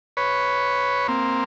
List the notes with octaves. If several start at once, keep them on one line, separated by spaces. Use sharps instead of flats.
B4 C#5
A#3 C4